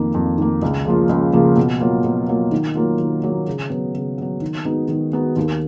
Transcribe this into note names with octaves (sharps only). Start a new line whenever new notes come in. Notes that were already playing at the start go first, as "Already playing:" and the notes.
Already playing: F2 D#3 A#3
F2
D#3 A#3
C#2
C#3 F3 A#3 F4
C#2
C#3 F3 A#3 F4
B2
F#3 A#3 F4
B2
F#3 A#3 F4
D#3
F#3 A#3 F4
D#3
F#3 A#3 F4
C#3
F#3 B3
C#3
F#3 B3
D#3
G#3 B3 D#4 F#4
D#3
G#3 B3 D#4 F#4
D#2